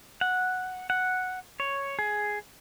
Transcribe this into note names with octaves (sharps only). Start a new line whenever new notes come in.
F#5
F#5
C#5
G#4